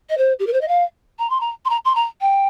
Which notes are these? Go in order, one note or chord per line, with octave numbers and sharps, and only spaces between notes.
D#5
C5
G4
A#4
C5
D#5
F5
A#5
C6
A#5
C6
A#5
C6
A#5
G5